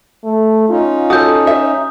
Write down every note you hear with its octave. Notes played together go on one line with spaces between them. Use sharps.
A3
C#4 D#4 F4
F#4 A4 D#6 G6
E5